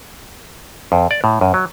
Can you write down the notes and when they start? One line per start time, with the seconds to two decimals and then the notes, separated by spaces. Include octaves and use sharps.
0.92 F2
1.11 D5
1.24 A2
1.41 F#2
1.54 F#3